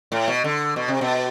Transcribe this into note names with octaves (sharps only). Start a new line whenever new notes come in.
A2
B2
D3
B2
C3
B2